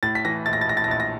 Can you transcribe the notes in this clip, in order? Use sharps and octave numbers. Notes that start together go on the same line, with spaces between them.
A2 A6
B6
E3 A#6
A#1 A6
A#6
A6
A#1 A#6
A6
A#6
A#1 A6
A#6